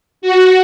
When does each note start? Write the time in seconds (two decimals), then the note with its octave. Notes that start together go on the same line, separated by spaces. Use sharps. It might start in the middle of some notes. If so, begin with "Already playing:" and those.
0.22 F#4